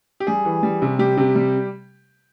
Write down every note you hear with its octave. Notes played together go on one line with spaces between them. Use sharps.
G4
G3 G#4
E3
G3
C3
G3 G4
C3
G3